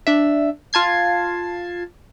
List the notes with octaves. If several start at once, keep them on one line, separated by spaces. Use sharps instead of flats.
D4 E5
F4 A5 G#6 C7